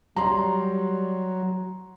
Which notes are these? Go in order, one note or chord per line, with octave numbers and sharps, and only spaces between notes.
F#3 G3 A#5 C6